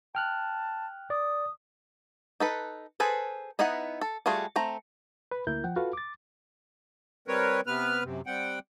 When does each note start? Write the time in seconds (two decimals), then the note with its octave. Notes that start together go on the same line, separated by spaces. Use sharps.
0.15 G5 A5 F6 F#6
1.10 D5 D#6
2.40 D#4 A4 B4
3.00 G#4 A4 B4 C5
3.59 B3 D#4 E4 D#5 F#5
4.01 A4
4.26 G3 A3 F4 F#4 G#4
4.56 A3 C4 A#5
5.31 B4 B5
5.47 D2 A#3 E4 A#4 G6
5.64 F3 F#5 G5
5.76 F4 F#4 A4 B4 F5
5.93 D6 A6
7.28 G3 C4 A#4 B4 C#5
7.66 C3 B3 B4 F6
8.04 F#2 C3
8.26 G3 C4 F#5 G5